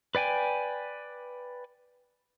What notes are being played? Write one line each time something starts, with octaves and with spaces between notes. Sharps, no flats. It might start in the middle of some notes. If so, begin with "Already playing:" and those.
B4 D5 G5 G#5